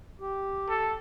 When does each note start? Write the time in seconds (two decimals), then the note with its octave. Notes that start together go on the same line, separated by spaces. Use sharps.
0.20 G4
0.69 A4